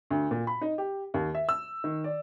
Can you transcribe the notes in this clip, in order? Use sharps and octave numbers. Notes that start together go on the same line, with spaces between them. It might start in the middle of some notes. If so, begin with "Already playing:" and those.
D2
A#2
B5
D#4
G4
D#2
E5
E6
D#3
D5